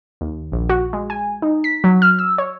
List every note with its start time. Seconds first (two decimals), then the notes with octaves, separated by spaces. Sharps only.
0.21 D#2
0.52 A#1
0.70 F#4
0.93 G#3
1.10 G#5
1.42 D#4
1.64 B6
1.84 F#3
2.02 F6
2.19 E6
2.38 C#5